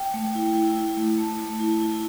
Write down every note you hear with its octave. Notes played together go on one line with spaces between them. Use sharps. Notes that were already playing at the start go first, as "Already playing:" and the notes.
Already playing: G5
A3
E4
E4
E4
A3
A3 A5
A3
E4
E4